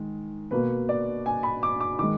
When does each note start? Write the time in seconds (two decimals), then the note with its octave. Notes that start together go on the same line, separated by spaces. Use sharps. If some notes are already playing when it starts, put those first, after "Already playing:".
Already playing: D#3 G#3
0.51 B2 A#3 B4
0.89 D5
1.26 G#5
1.43 B5
1.63 D6
1.80 D6
1.99 D#3 G#3 D6